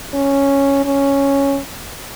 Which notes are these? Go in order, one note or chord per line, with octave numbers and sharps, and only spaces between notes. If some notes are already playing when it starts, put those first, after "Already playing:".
C#4
C#4